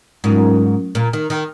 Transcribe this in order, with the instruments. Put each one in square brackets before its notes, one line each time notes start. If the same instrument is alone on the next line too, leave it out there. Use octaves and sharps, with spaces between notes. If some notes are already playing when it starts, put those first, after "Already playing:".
[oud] G#2 [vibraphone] F#3 C#4 F4 A#4
[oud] A#2
D#3
D#3